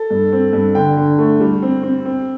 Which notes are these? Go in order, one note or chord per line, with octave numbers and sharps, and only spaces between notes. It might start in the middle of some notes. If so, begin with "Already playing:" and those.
Already playing: A4
G2
C4
G2
D3 G5
D3
A3
G3
C4
C4
C4